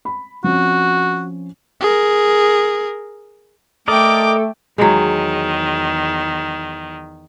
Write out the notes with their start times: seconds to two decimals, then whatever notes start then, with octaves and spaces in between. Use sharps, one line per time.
0.05 B5
0.44 F3 C4 C#4 F#4
1.81 G#4 A#4
3.88 A3 A4 A#4 D5 D#5 G5 D6
4.78 E2 D#3 F#3 G#3